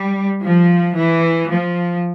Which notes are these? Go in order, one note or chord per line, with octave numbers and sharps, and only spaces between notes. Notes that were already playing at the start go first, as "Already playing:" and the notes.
Already playing: G3
F3
E3
F3